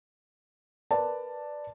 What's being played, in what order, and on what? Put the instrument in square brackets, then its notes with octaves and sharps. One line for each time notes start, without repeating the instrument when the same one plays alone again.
[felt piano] A#4 B4 D5 A5